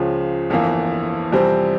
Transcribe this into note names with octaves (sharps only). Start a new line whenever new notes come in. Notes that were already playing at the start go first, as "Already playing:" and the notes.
Already playing: C#2 C#3 F3
G1 F2 E3 A#3
F2 C3 E3 G3 C4